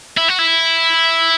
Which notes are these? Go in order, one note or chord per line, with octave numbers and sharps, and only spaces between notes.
E4
F#4
E4